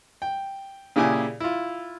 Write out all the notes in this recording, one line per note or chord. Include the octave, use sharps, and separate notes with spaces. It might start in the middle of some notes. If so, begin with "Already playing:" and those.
G5
A#2 C#3 E4 G4 G#4 G#5
E4 F4